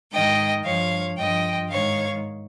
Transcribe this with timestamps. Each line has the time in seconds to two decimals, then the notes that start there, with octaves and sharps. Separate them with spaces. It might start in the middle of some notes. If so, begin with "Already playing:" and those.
0.12 G#2 D#3 D#5 G5
0.65 G2 F3 C#5 F5
1.17 G2 F3 D#5 G5
1.70 G#2 D#3 C#5 F5